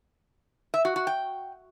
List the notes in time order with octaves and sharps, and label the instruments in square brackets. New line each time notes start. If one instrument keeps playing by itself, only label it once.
[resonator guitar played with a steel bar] E5
F#4
F#4
G5